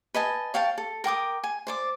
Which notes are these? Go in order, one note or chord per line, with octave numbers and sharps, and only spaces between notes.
B4 D#5 G#5 A5
C#5 F5 G5 A5
A4
A#4 G5 D6 D#6
G#5
C5 D5 D6